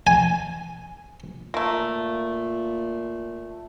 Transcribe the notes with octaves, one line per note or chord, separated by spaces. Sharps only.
G#5
A#2 A3 A#3